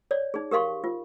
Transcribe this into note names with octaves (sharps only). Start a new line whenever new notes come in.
C#5 D5
D#4 G#4
G4 A#4 F5 C6 C#6
F4